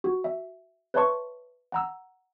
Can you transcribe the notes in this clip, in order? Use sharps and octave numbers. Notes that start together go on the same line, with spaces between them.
F#4
E5
B4 C#5 E5 A5 C6 C#6
F#5 A#5 E6